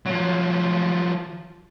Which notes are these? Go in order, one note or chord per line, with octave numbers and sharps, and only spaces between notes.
F3 F#3